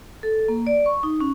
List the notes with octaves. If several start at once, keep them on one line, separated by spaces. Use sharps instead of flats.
A4
A#3
D5
C#6
D#4
C#4